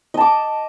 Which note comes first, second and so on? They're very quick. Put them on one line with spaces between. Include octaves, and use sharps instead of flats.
D#5 A5 D6